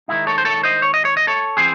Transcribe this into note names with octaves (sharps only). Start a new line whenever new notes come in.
D#3 G#3 D#4 E4
A4 C#5
C5
A4 C#5
C5 D#5
C#5
D#5
C#5
D#5
A4 C#5
E3 C4 G#4 C5